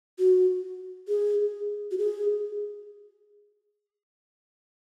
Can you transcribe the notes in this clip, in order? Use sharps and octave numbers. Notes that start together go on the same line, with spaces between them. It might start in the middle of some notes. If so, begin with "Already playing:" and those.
F#4
G#4
F#4
G#4